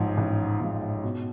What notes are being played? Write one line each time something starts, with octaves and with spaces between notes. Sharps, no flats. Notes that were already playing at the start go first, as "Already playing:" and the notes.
Already playing: A1 G#2 F3
A1
G#2 F3
B2